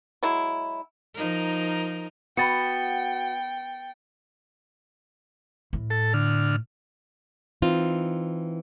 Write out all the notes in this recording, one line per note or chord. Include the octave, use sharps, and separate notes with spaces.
F#3 G#3 E4
F3 D#4 A#4
B3 F#4 F#5 G5 A6 C#7
A2
A4
D3 F6
E3 C4 D#4 F4